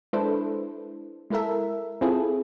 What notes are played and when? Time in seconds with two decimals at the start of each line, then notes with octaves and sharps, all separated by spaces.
0.13 G#3 D4 E4 A4 B4 C5
1.30 G#3 E4 A4 A#4 E5
2.01 C4 E4 F4 G#4 A4